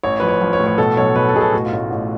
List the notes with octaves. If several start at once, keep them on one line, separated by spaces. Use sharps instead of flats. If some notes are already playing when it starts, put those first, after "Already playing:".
A1 C#5
F3 B4
C#5
F3
C#5
A2
C#5
B2 A4
B1 C#5
B2 B4
A4
B2 G#4
A4
A2 F#4
F4
A1
A1